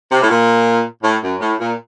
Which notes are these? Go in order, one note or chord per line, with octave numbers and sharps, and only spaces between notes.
C3
A2
A#2
A2
F#2
A2
A#2